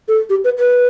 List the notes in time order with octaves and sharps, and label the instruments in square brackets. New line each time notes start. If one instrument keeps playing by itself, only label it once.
[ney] A4
G4
B4
B4